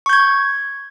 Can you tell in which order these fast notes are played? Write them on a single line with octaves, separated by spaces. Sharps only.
C#6 G6 G#6